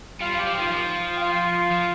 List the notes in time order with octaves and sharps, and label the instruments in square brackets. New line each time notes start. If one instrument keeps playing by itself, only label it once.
[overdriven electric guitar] G3 [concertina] F4 F5
[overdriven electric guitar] F3 [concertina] G4 G5
[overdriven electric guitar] F3
[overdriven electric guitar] D#3 [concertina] F4 F5
[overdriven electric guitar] F3
[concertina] G5
F4 F5
[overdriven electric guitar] F3